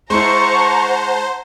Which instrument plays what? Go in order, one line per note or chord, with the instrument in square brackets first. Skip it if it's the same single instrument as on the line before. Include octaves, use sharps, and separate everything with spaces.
[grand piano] G#3 E4 [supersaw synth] C5 [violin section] F#5 A5 A#5 [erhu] C#6